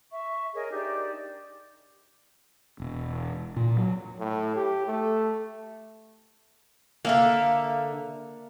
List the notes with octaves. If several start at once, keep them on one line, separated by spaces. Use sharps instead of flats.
E5 C#6
G#4 A#4 C#5 D#5
D4 D#4 G4 D5
E1
A#2
F#3
A2
G4
A3
D3 A#3 E5 F5